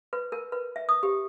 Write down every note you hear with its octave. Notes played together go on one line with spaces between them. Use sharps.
B4
A#4
B4
E5
D#6
G4